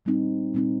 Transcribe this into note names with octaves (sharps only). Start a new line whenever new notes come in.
A#2 G3 C4 D#4
A#2 G3 C4 D#4